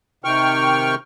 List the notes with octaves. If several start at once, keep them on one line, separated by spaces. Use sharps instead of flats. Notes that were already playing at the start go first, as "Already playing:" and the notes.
C3 D#3 G5 C#6 F6